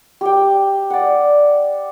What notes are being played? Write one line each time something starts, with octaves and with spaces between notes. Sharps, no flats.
G4 G5
D5 F#5